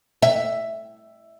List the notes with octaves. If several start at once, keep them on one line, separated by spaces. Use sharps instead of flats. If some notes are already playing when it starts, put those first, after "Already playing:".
E5